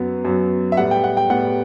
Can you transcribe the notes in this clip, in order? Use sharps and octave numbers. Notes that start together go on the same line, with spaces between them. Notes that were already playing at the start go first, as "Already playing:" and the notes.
Already playing: F#2 F#3 B3
F#2 F#3 B3
E5
A2 G3 B3 F#5
G5
F#5
G5
A2 G3 B3 F#5